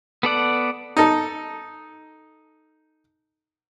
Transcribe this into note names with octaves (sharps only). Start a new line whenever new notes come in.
B3 A4 D5 F#5
D#4 A4